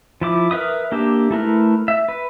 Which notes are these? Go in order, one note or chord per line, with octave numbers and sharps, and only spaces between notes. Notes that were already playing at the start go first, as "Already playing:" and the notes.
F3 E4 D6
A#4 B4 E5 D#6
A#3 D4 G4 E5
A3 E4 A#4 B4
E5
B4